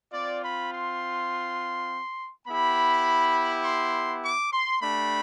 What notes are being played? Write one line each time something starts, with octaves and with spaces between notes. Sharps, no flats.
C4 F4 D5
B5
C6
B3 E4 G4 B5
C6
D6
C6
A3 D4 G4 B5